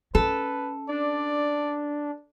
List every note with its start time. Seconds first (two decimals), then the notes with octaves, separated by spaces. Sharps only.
0.15 C#4 A4 B4
0.89 D4 D5